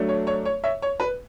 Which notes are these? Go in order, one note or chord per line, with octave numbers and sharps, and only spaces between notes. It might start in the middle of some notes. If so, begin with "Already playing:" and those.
Already playing: F#3 A3 D4
C#5
C#5
C#5
C#5 E5
C#5
B4